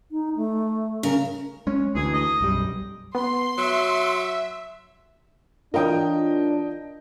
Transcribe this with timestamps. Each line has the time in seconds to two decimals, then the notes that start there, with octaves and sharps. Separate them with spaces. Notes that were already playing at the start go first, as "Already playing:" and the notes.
0.11 D#4
0.36 A3
1.03 C#3 A#4
1.67 G#3 C#4
1.95 D2 E3 G#4
2.13 D#5
2.41 B1 F#2 G3
3.15 B3 C6
3.58 F#3 E5
5.74 E3 D4 F4 A#4 C#5 D#5 G5 D#6